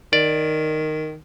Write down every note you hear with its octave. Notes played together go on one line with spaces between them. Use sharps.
D#3 D5